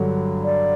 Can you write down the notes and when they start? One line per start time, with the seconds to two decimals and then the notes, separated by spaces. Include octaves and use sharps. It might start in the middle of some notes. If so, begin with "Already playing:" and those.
Already playing: G2 D3 F#3
0.44 D5